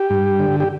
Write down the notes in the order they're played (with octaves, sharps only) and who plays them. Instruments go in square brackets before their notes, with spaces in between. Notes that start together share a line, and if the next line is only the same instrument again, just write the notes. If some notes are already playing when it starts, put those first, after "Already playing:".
Already playing: [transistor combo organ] G4
G2
D3
G4